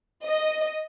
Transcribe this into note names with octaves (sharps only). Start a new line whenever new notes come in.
D#5